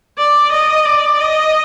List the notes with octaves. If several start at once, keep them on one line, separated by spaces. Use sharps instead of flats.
D5
D#5
D5
D#5